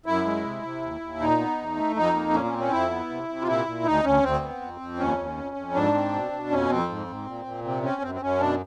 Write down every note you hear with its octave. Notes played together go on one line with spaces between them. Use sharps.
F#2 E4
G#3
C3
C3
D#2
D#2
A#2 D#4
B3
E2
A3
F2 D#4
A#3
A#2 C#4
C#4
C4
C#4
F2 E4
B3
C3
C3
F4
A#2 E4
A#2
D2 D#4
D2 C#4
D2 C4
B3
F2
F2
D#2 C#4
D#2
F2
F2
G#2 D4
C4
B2
B2
F2 C#4
F2 C4
G#2
G#2
A#2
A#2
C3 C4
C4 C#4
F#2 C4
C4
F#2 C#4
B2 D4